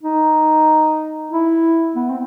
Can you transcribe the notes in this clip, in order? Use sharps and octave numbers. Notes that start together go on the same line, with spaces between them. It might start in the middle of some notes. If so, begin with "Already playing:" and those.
D#4
E4
B3
C4